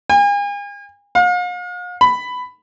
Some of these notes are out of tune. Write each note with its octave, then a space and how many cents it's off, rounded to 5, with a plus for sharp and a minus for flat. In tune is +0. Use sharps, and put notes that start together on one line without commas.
G#5 -40
F5 +45
B5 +10